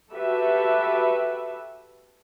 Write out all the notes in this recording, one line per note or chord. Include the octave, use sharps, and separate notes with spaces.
F#4 G4 A4 B4 E5